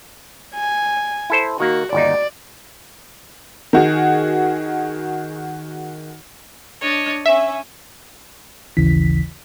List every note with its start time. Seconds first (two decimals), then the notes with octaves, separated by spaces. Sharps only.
0.55 G#5
1.30 E4 A4 C5
1.60 D#3 A#3 F#4
1.93 G1 D#2 D#4 D5
3.73 D#3 F#4 G#4
6.82 D4 C#5 D#5
7.26 C#4 E5
8.77 A1 D#2 C#3 E3 B6